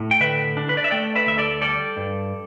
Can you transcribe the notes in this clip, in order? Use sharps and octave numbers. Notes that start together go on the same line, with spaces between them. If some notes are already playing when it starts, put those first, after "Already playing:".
Already playing: A2
G5
D3 B4 E5
D4
B4
D5
E5
A3 D5 G5
B4 E5
D2 E5
A4 D5
G3 A4 D5
G2